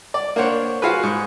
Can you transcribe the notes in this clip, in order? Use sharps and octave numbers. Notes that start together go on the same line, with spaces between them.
D5
A#3 D4 C5 C#5 F#5
F4 F#4 G#4 B4
G#2